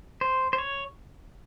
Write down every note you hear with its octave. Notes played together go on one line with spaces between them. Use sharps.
C5
C5
C#5